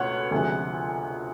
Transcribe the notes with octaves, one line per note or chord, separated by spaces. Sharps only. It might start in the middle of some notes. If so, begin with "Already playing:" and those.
Already playing: C#2 B2 A3 C#5 F#5
D2 C3 F3 G#3